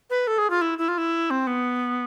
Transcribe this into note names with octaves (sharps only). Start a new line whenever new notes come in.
B4
A4
G#4
F4
E4
E4
F4
E4
C4
B3